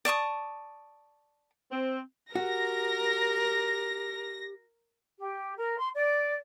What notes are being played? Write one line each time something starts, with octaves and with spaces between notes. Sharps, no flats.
D5 A5 C#6 D#6
C4
F#4 G4 A#4 A#6
G4
A#4
C6
D5